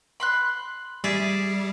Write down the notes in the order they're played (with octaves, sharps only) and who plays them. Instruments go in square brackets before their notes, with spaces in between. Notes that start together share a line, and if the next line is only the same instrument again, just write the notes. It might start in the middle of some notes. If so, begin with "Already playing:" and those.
[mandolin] B5 C6 F#6
[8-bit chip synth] G3 [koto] G#4 D5 E5